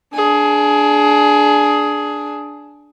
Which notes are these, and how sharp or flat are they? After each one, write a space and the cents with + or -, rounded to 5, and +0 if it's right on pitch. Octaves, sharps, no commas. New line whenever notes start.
D4 -5 G#4 +15